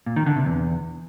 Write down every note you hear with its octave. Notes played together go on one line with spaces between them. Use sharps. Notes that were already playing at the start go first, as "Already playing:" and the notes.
A#2
D#3
D3
C3
E2